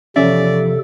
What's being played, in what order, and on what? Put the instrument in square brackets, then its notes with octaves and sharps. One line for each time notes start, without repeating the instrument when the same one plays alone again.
[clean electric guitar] E2 F3 E5 [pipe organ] C3 A4 [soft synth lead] C#4 [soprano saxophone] D5